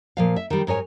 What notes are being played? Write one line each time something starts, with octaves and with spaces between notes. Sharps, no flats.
A#2 F3 F5
E5
D#3 G3
G#2 A#4 C#5 G#5